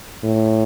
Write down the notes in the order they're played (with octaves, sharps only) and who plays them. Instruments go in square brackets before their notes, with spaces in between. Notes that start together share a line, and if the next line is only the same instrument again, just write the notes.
[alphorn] A2